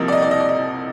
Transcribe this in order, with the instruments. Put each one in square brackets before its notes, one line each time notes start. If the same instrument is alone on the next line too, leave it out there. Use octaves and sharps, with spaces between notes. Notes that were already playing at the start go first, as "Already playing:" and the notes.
Already playing: [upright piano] C2 C3 F3 A#3 D#5
D5
D#5
D5
D#5
D5
D#5